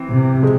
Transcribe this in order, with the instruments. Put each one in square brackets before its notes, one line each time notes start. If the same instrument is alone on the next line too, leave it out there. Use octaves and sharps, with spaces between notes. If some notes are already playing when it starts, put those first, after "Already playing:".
Already playing: [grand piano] E3 C4
[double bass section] C3
[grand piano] F3 G#3